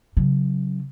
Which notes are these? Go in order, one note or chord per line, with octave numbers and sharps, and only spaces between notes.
C#3 F#3